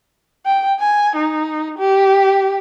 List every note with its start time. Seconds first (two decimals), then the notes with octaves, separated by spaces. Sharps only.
0.46 G5
0.80 G#5
1.16 D#4
1.78 G4